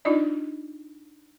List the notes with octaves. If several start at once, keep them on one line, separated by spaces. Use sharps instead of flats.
D4 D#4 F4 D5 D#5